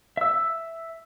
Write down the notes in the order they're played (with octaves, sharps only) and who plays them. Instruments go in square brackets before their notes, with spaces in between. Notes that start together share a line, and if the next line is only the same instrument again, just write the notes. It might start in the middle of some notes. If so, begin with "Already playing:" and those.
[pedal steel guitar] E5 E6